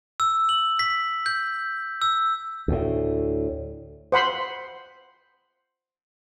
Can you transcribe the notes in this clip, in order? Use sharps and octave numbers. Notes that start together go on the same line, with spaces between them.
E6
F#7
B6
G6
E6
D2 A2
C5 F#5 B5 C6